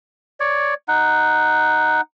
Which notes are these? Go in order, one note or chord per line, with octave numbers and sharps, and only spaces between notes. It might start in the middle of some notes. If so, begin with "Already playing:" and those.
C#5 D5
D#4 F#5